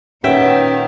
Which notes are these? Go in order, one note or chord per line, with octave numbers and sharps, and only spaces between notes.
A#2 D#3 B3 C#4 C#5 E5 G5